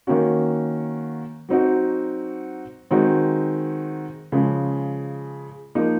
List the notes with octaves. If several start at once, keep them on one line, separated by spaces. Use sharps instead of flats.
D#3 A#3 C#4 F#4
F#3 C4 D#4 F#4
D#3 G#3 C4 D#4 F#4
C#3 F3 G#3
F3 A#3 D#4